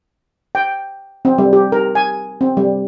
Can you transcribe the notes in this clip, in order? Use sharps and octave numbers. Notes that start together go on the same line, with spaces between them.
G5
C4
G3
G4
A#4
G#5
C4
G3